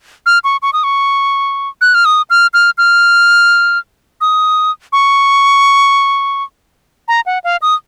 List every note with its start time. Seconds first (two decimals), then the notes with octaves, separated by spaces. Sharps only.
0.26 F6
0.44 C#6
0.62 C#6
0.73 D#6
0.84 C#6
1.81 F#6
1.94 F6
2.05 D#6
2.30 F6
2.54 F6
2.78 F6
4.21 D#6
4.93 C#6
7.08 A#5
7.26 F#5
7.44 F5
7.62 D#6